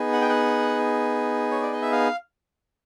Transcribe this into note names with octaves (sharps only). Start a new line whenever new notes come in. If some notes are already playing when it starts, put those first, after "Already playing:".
Already playing: B3 D#4 G#4
F#5
G5
F#5
C#5
D5
D#5
E5
F5